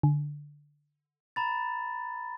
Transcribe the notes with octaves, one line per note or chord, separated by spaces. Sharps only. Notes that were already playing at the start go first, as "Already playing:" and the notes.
D3
A#5 B5 A6